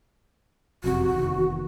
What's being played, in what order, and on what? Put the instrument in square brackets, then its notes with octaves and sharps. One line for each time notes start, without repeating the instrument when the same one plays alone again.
[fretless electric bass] F#1 F2 C3 [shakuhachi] F#4
[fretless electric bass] F1 E2 D#3